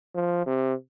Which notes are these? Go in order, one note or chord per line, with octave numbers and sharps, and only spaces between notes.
F3
C3